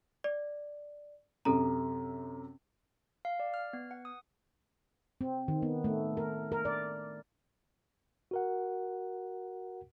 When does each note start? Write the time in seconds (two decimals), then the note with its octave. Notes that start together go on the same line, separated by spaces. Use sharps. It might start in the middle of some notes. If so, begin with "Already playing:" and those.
0.24 D5
1.45 F#2 C3 A4 A#5
3.25 F5
3.40 D5
3.54 F6
3.73 B3
3.91 F#5
4.05 D#6
5.21 C4
5.48 D#3
5.62 B3
5.84 A3
6.17 A#4
6.52 A#4
6.65 D5
8.31 F#4 A#4 F#5